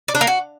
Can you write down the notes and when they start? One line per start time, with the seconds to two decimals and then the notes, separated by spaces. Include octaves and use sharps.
0.08 D5
0.15 D4
0.21 A#3
0.27 F#4